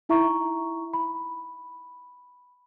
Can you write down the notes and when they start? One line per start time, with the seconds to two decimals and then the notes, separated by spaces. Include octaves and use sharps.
0.09 D#4 E4 E5 A#5 C#6
0.94 B5